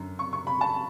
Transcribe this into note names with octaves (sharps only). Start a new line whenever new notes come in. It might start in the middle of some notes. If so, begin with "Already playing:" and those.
Already playing: F#2 D3
C#6
C#6
B5
A5